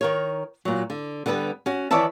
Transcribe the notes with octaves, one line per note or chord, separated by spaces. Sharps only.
D#3 A#4 C#5
A#2 F#3
D3
D3 G3 B3 A#4 B4
C#4 F#4
D#3 E3 C#5 D5 E5 A5